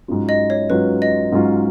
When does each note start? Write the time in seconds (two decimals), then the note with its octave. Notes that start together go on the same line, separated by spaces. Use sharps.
0.08 G#2 F#3 C#4 F4
0.29 D#5
0.50 C#5
0.70 G#2 F#3 C#4 F4 B4
1.02 D#5
1.32 G#2 F#3 C#4 F4